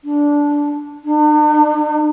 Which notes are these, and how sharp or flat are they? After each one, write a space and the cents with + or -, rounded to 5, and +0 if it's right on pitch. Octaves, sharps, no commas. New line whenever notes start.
D4 -10
D4 +45